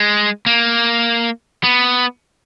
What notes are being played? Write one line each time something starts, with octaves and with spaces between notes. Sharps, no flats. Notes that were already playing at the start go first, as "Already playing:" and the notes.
Already playing: G#3
A#3
B3